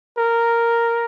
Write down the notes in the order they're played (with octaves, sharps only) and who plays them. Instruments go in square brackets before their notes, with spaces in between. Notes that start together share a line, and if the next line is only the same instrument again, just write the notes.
[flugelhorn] A#4